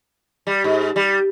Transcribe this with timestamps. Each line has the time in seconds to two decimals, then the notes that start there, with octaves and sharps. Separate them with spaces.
0.47 G3
0.64 G#2
0.96 G3